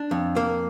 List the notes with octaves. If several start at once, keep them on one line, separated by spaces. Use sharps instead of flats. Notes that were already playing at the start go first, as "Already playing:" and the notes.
Already playing: D4
F2
A#3